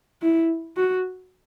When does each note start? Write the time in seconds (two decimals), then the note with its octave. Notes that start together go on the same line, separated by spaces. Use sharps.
0.22 E4
0.77 F#4